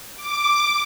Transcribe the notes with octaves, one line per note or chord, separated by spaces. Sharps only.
D6